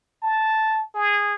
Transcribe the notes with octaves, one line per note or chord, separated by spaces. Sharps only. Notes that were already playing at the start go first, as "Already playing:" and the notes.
A5
G#4